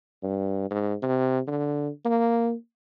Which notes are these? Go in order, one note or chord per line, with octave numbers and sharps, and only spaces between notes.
G2
G#2
C3
D3
A#3